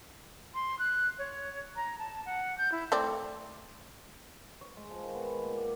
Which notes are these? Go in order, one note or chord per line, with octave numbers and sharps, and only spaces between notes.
C6
F#6
C#5
A#5
A5
F#5
G6
E4
A3 C4 D5
C#5
G#3
F3
D#3
B3
A#2
D5